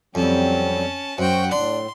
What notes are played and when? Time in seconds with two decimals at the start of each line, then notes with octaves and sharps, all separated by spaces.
0.15 F2 F#3 G3 C4 C#4 A5
1.18 F#2 F#4 C5 F#5 G5
1.52 A2 D4 C6